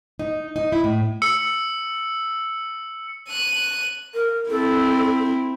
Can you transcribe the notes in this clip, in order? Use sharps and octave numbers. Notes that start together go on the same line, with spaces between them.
D#4
D#4
E4
A2
E6 C#7
F#6 D#7
A#4
C4 E4 A4